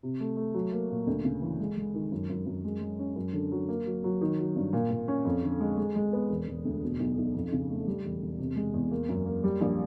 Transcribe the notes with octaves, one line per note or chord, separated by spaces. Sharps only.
C3
A3
A3
F#3
A#3
A#2
D2
C#3
E3
G#3
G#3
D#3
F#2
F#2
F#2
G#3
G#3
C#4
F#2
D3
F#3
A#3
F#3
F#3
D#3
F#3
G2
A#2
A#2
C#4
F2
D3
G#3
G#3
G#3
B3
E1
E1
D2
B2
B1
B1
F2
C#3
A3
G3
E1
E1
C3
G#3
E2
A#3
F#2
A#3
G3
A#1